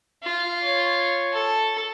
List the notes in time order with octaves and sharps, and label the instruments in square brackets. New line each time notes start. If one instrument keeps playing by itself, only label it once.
[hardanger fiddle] F4
[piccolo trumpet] C#5
[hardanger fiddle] A4